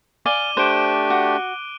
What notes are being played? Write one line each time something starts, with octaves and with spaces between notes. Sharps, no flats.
D5 F5 G#5 D6 D#7 G7
A3 D4 G4 C5 F#6 D7
F#4